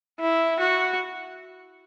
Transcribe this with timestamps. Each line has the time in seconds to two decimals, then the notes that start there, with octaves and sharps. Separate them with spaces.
0.20 E4
0.60 F#4